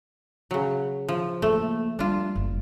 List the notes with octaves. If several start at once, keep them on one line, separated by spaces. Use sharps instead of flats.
C#3 F#3
F3
A3 A#3
G3 A3 D4 F4
F#1